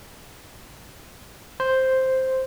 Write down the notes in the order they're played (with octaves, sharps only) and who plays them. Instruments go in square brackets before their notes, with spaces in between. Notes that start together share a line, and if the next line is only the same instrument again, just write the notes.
[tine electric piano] C5